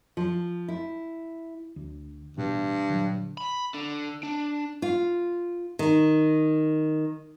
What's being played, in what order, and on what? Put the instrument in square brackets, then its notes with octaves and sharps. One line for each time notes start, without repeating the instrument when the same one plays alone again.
[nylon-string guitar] F3
E4
[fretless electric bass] D2
[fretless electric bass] A1 B2 B3 [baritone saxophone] G2
[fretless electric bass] A#2 D3 F#3
[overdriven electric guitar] B5
D3
D4
[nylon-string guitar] F4
D#3